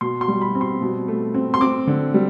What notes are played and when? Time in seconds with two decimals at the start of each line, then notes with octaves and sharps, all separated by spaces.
0.01 B2 C6
0.21 C6
0.28 G3
0.41 B5
0.55 C4
0.61 C6
0.81 B2
1.08 A3
1.34 C4
1.54 C6
1.61 C4 D6
1.87 D3
2.14 G3